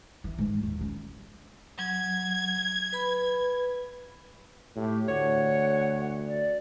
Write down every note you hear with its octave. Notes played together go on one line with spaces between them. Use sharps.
E3
G#2
D#2
C#4
F#3 G#6
B4 B5
A2 G4
D2 C#5 F#5
D5